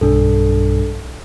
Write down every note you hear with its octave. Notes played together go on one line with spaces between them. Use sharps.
B1 G2 D4 A4